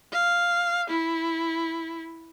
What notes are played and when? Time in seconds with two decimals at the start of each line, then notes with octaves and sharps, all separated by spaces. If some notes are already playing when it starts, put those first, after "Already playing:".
0.12 F5
0.90 E4